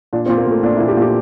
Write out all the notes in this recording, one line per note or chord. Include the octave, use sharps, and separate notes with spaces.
A#2 D4
C4
A#2
A#3
A#2 A3
A#2 D4
E4
A#2
G4
A#2
G4